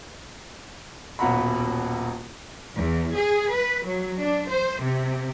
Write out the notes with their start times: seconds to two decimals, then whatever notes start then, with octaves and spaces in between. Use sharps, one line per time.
1.19 D#1 B1 F#4 F#5 A#5 B5
2.74 E2
3.13 G#4
3.51 B4
3.85 F#3
4.18 D4
4.47 C5
4.80 C3